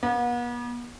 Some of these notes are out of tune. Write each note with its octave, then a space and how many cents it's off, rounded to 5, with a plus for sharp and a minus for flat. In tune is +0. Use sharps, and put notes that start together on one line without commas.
B3 -40